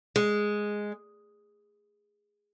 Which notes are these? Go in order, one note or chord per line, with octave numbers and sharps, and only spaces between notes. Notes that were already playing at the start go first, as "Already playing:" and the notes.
G#3